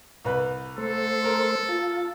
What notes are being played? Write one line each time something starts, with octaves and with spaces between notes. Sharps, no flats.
C2 B4
A3 A4 C5
A#4
F4 A5